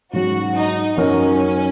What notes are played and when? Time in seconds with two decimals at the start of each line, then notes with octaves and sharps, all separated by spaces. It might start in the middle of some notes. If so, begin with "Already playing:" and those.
0.13 G#2 F#3 C#4 F#4
0.56 D#4
0.97 F#2 F#3 C#4 D#4 A#4